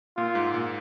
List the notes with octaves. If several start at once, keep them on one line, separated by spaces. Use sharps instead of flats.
A#2 F4
G#2
A#2